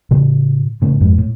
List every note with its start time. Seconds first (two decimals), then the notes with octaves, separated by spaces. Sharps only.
0.11 A2 C#3
0.82 A2 C#3
1.00 F2 G#2
1.18 A2